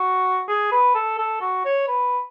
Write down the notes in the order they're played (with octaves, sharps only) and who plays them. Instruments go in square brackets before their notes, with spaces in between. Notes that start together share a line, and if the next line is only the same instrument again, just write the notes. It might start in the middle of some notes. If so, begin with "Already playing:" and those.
Already playing: [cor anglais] F#4
G#4
B4
A4
A4
F#4
C#5
B4